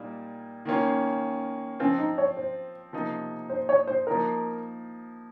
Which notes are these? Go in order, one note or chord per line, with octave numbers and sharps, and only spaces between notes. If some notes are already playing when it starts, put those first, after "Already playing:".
Already playing: A#2 G3 A#3 D#4
D#3 A#3 C#4 F4
F3 C4 C#4 F4
D#4
C#5
C5
C3 F3 A#3 D#4
C5
C#5
C5
F3 A#3 D#4 A#4